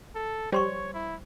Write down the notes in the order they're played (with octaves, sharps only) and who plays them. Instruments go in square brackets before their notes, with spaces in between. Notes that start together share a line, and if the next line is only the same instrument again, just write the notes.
[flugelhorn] A4
[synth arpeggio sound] G3 [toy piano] C5 C6 C#6 [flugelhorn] C#5
[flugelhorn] E4